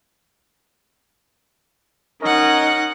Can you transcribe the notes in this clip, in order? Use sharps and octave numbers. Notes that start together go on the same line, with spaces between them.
C#4 D#4 A#4 D#5 F#5